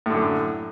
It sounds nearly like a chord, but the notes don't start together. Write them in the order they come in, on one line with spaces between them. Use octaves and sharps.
A2 D3 F#2